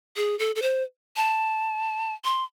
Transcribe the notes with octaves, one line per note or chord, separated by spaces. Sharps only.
G#4
A4
A4
C5
A5
C6